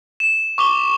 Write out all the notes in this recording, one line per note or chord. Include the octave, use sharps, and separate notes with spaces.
E7
C#6 D6 G7